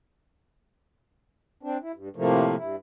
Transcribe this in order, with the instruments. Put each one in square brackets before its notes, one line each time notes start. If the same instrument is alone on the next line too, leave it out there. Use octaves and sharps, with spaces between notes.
[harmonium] C4 D4
E4
G2
A2 C3 F3 A3 A#3
G2 E4